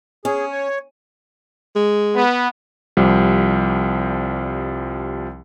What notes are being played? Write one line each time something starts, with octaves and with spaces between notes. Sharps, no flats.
C#4 G#4
C#5
G#3
B3
C2 F3 G3